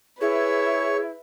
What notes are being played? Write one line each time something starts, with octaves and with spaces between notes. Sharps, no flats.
E4 G#4 B4 C#5 E5